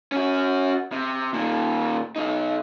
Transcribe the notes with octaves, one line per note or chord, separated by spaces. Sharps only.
C#4 F#4
C3
A#2 D#3
B1 D#4